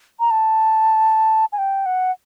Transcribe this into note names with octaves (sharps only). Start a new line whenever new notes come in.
A#5
A5
G#5
G5
F#5